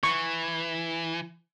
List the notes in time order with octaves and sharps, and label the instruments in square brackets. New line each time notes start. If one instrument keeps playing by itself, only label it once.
[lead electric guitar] E3 [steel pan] C#6